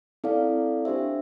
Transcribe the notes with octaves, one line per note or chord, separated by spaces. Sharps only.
C4 E4 A4 D5 F5
D4 G4 C5 E5